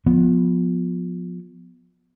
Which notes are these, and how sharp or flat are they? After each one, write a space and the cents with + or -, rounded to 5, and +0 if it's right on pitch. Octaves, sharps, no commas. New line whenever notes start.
F3 +25 B3 +0